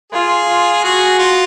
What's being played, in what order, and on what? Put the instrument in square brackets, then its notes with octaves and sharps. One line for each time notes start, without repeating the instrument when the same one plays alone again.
[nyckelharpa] F4 [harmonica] G#4
[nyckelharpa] F4
[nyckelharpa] F#4 [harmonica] G#4
[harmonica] F4